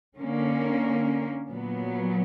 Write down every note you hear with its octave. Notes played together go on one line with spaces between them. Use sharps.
D3 A#3 C#4
A#2 F#3 B3